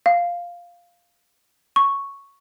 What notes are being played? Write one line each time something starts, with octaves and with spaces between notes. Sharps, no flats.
F5
C#6